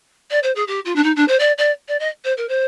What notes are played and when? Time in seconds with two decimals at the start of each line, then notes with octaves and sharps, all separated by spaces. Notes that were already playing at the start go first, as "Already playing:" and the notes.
0.31 D5
0.43 C5
0.55 G#4
0.67 G4
0.85 F4
0.96 D4
1.03 D#4
1.16 D4
1.28 C5
1.39 D5
1.58 D5
1.88 D5
2.00 D#5
2.25 C5
2.37 A#4
2.49 C5